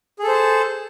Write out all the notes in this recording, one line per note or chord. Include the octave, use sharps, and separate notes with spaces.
G#4 A4 C5 A5